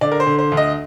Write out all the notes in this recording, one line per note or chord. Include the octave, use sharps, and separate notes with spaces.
D3 D5
A#4
C5
D3
C5
D2
D#5